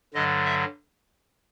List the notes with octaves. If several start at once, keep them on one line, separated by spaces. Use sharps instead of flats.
G2 D3 F#3 D#5
E5